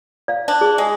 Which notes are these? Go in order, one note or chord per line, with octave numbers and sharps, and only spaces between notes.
D5 F5
D4
G#4
G#3